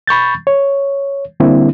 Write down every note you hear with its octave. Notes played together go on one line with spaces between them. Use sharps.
B5 C#6 G6 A6
C#5
D3 G3 A#3 C4 D4 E4